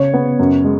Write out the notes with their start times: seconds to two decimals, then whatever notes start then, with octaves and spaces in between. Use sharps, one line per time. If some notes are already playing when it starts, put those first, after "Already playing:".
Already playing: C#3 C#5
0.14 B3
0.39 F#2
0.64 G#3